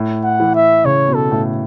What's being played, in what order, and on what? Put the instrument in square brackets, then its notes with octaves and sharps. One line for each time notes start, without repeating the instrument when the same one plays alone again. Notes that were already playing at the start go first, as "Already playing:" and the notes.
Already playing: [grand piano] A2
[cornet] F#5
[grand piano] E3
[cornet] E5
[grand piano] C#3 [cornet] C#5
[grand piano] B2
[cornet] A4
[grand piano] A2